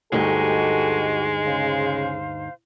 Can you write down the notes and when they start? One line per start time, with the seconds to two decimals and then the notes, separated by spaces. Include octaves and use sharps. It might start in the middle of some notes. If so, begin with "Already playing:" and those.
0.12 D2 G2 G#3 D#4 F#4 G4 A4 G#5
1.46 C#3 C5 F5